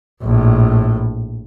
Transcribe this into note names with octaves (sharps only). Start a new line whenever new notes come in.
A#1 A2